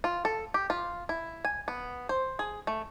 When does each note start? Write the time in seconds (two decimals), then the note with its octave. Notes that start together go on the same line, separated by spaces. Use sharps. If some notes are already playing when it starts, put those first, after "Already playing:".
0.04 F4
0.25 A4
0.54 G4
0.70 F4
1.09 E4
1.45 G#5
1.68 B3
2.09 C5
2.39 G#4
2.67 A3